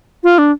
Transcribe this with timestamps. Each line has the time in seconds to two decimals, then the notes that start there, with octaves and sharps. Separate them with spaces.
0.23 F4
0.38 D4